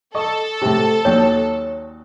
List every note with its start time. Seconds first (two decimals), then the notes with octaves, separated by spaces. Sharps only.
0.15 A4 D#5 C#6 D#6
0.62 A2 C3
1.05 D#2 A#2 F#3 C#5